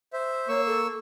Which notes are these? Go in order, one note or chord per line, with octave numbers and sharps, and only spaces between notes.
C5 E5
A#3 C#5 C#6 E6
A4